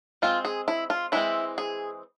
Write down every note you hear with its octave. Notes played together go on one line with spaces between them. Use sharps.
G#3 C4 F4
G#4
E4
F4
E3 G#3 C4 E4
G#4